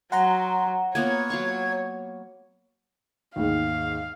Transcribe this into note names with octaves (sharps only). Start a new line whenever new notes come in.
F#3 F#5 A#5 C6
A#3 B3 F4 C#5 G#6
F#3 F5 C#6
D#2 G#2 F5